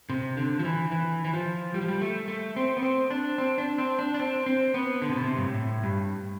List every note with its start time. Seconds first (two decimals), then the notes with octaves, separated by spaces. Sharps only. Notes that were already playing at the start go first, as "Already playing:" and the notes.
0.10 C3
0.37 D3
0.59 F3
0.65 E3
0.92 E3
1.25 E3
1.34 F3
1.74 G3
1.81 F3
1.88 G3
2.02 A3
2.28 A3
2.56 C4
2.77 B3
2.83 C4
3.10 D4
3.38 C4
3.58 D4
3.78 C4
3.99 D4
4.14 D4
4.19 C4
4.46 C4
4.74 B3
5.02 D3
5.09 C3
5.16 B2
5.24 C3
5.37 G2
5.42 A2
5.83 G2